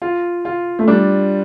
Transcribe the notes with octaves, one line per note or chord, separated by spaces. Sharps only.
F4
F4
A3
G3 D4